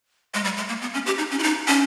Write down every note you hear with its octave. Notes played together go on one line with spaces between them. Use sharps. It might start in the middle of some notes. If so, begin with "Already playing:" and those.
G#3
G3
G#3
A#3
B3
C#4
G4
D#4
C#4
E4
D#4
C#4